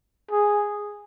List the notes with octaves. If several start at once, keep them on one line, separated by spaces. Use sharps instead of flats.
G#4